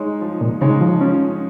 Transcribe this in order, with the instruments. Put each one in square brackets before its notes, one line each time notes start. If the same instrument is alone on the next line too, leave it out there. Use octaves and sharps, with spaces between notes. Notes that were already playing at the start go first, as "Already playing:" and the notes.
Already playing: [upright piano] G#3 D#4 C#5
F3
[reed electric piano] A#2
[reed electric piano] C#3 [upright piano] G#3 D#4 C#5
[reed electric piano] F3
[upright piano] F3 [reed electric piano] C#4